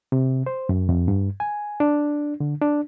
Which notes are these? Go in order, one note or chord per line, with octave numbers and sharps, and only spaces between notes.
C3
C5
F#2
F2
G2
G#5
D4
D3
D4